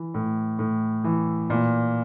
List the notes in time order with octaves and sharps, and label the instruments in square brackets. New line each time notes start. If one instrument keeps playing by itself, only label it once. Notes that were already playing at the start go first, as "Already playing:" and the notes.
Already playing: [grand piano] E3
A2
A2
E3
A#2